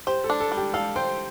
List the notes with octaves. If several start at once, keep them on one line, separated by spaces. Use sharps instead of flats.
G4 C5
A4
D4
A4
G3
G4
A4 F5
C5 G5